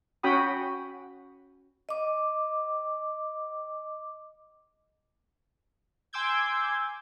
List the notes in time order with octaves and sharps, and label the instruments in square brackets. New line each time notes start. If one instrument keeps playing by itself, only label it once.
[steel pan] C#4 F#4 G5 B5 D#6
[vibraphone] D#5 D6
[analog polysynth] G#5 C6 D6 E6 G6 G#6